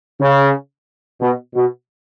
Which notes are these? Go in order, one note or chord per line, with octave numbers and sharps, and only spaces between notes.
C#3
B2
B2